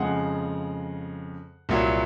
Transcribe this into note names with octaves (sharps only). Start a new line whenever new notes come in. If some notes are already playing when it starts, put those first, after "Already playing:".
Already playing: F2 C#3 G#3 F#5
C2 A#2 F#3